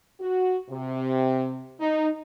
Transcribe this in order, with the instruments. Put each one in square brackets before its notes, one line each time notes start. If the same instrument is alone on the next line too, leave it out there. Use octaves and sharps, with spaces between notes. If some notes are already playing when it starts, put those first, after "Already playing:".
[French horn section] F#4
C3
D#4